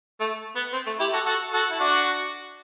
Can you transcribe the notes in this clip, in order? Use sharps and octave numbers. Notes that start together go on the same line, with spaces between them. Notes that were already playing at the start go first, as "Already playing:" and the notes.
A3
B3
C4
A3
E4 G4
F#4 A4
F#4 A4
F#4 A4
E4
D4 F#4